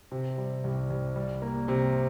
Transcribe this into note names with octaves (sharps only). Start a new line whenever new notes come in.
C3
G3
C2
C2
G3
A#3
C3